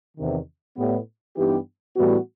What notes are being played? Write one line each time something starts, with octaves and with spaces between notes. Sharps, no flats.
E2 C3 D#3
A2 G3 B3
G2 E3 B3 D#4 G4
A2 E3 G3 B3 F#4